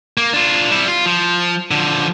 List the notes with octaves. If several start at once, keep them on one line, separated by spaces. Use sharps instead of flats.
A#3
D4 F4
G3 E4
F4
F3
D3 F3